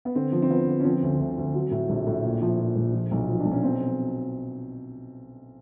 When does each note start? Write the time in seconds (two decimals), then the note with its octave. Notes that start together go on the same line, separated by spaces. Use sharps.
0.05 B3
0.15 D3 C4
0.32 F3
0.42 C4
0.50 F3 B3
0.67 D3
0.80 C#4
0.85 F3 C4
1.03 D2
1.19 D2
1.38 D2
1.54 F#3
1.71 A2
1.89 A#1
2.07 A2
2.24 A#2
2.42 F3
2.58 A#2
2.76 A#1
2.93 F3
3.11 B1
3.29 F3
3.39 D4
3.45 B1
3.52 C#4
3.63 B2 C4